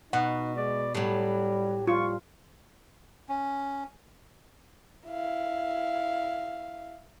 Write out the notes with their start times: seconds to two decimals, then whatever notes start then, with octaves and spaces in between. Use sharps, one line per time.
0.13 B2 D#4 F#5
0.56 G#3 D5
0.95 A2 F#3 G3 G4
1.87 G3 F4 C#6
3.29 C#4
5.08 E4 F5